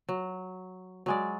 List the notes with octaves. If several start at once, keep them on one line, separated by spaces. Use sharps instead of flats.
F#3
F#3 G#3 D5